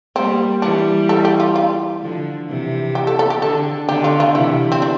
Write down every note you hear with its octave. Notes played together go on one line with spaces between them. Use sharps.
G3 A#3 C4
E3 G3 D4
A4
G4
F4
F4
D3 F3
C3 E3
G4
A4
A4
G4
D3 A4
D3 G4
F4
F4
C3 E3 E4
C4
D4